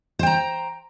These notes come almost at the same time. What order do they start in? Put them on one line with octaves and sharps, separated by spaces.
C5 G5 A#5